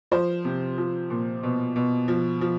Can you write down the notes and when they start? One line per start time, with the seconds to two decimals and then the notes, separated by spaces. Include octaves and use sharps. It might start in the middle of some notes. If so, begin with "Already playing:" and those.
0.11 F3 C5
0.45 C3
0.78 F3
1.10 A#2
1.43 B2
1.76 B2
2.08 F3
2.41 F3